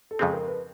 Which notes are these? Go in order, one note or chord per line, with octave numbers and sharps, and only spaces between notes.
A4
F2 C#3 F3 G#3 C4 G#4
A#4
B4